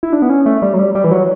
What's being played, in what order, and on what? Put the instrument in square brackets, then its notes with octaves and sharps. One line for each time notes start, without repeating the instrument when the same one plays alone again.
[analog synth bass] E4
D4
B3
C#4
A3
G3
F#3
G3
G3
E3
F#3